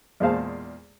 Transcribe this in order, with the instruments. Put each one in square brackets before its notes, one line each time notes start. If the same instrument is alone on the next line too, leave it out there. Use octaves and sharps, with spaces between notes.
[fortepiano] E2 A#2 G#3 C5 F5 A5